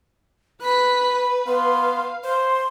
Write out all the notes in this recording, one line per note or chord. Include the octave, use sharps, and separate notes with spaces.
B4 B5 F#6 B6
B3 F5 C6
C5 C6